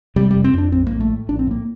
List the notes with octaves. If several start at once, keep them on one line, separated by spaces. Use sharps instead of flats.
C3 G3
F1 G3
C4
F2 D4
A#1 C4
A2 A#3
A3
A2
A#1 D4
C4
A2 A#3